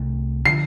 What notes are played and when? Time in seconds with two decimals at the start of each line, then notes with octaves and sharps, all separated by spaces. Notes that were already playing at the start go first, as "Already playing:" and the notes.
Already playing: C2 C3 A3 D4
0.45 D3 F3 D4 C7